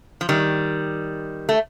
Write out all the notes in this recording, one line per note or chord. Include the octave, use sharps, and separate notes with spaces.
F3
D#3 G3
A3